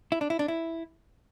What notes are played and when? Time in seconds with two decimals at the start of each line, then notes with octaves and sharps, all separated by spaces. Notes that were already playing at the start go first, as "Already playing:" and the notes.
0.12 E4
0.21 D4
0.30 E4
0.39 D4
0.48 E4